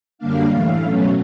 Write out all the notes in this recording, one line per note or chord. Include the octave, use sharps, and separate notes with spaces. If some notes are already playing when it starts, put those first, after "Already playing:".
F#2 D3 G3 A#3 D4 F5
A2 E3 A3
B2 F#3 A3 C#4